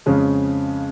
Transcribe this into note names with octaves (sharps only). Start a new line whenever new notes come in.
F2 C#3 G#3 C#4